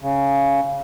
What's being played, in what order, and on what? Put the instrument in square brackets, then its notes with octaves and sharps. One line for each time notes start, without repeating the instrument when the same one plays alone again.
[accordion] C#3